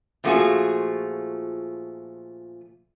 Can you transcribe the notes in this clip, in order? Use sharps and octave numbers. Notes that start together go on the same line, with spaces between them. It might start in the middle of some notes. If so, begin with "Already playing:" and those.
A#2 F3 A3 C#4 F#4 G#4